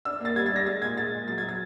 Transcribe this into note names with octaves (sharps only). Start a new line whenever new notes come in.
D4 E6
A#3 A6
G3 G#6
A6
D4 A#6
G#3 A6
A#2 G#6
G#3 A6
A#2
F#3 A6
G#6
F#3
A6